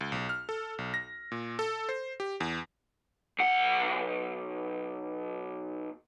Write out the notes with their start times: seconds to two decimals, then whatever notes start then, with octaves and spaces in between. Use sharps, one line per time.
0.01 C#2
0.12 B1
0.29 F6
0.49 A4
0.78 B1
0.94 A#6
1.32 A#2
1.59 A4
1.89 C5
2.20 G4
2.40 E2
3.39 B1 F#5